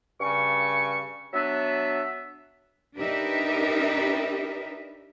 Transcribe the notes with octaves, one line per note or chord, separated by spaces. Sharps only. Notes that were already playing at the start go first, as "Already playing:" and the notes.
G2 C#3 C#4 C#6
F#3 B3 D4 E5
D4 D#4 G4 A#4 B4 E5